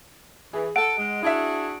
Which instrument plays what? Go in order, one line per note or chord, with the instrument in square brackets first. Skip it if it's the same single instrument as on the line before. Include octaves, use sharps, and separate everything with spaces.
[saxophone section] E3 [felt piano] G#4
[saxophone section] A4 [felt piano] F#5 [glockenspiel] D7
[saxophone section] G#3
[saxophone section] D4 F#4 G#4 [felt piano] E4 E5